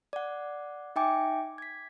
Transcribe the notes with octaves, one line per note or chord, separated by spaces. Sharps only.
D5 F#5
D#4 E5 G5 G#5 D6
G#6 B6